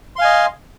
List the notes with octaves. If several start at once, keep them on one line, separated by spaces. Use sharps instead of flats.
D#5 F5 G#5 C6